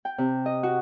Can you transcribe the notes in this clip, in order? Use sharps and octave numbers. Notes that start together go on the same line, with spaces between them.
G5
C3
D#5
F#4